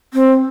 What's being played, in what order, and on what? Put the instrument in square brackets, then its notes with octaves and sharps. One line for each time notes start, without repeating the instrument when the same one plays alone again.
[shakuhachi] C4